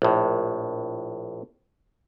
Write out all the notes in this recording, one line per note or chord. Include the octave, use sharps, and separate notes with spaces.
A#1 A2